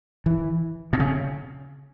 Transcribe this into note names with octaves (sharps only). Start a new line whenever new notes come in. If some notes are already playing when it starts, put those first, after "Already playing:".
E3
B2
C#3